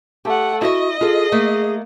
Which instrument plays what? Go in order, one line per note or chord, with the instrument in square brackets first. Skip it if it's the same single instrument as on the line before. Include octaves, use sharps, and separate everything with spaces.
[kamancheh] A3 F#5 [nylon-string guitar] G4
[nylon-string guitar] E4 E5 [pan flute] F#4 [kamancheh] D#5
[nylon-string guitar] F4 A4 [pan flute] G#4
[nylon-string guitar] A3 A#3